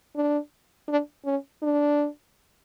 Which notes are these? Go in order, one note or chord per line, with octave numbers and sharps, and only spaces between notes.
D4
D4
C#4
D4